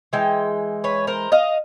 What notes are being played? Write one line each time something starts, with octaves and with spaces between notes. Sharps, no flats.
E3 G#3 G5
B4 C#5
A#4 C5
D#5 F5